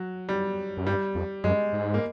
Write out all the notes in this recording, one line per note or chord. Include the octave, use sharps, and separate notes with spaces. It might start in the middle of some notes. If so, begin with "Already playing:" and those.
Already playing: F#3
G3
F#2
G2 G3
F2
F#2 G#3
G#2
A#3